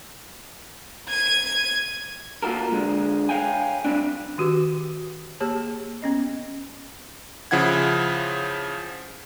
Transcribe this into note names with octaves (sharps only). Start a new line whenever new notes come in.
G#6 D#7
A#3 F4 F#4 A4 A#4
D3 G#3
C#5 F5 G5 G#5
G2 G3 A3 C4 D4
D#3 F#4 G4 B4 D6
A#3 G4 G#4 C#5 A5
B3 C#4 D#5
C#3 F3 E4 F#5 G#6